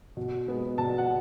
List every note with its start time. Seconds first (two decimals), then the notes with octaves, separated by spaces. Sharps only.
0.17 B2
0.48 G#3 B3
0.78 B2 A5
0.98 F#5